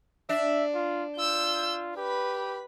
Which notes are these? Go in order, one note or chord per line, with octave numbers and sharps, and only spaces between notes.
D4 E5
F4
F4 E6 G6
G4 B4 B5